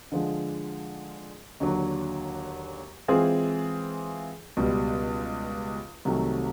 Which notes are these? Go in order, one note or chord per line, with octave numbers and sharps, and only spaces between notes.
D3 F3 G#3
D#2 D3 F#3
E3 G#3 C4 F4 G#4
C#2 B2 G3
C2 C3 D#3 F#3 A3